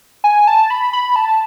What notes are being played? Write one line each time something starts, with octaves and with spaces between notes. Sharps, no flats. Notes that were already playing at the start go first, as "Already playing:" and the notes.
G#5
A5
B5
B5
A5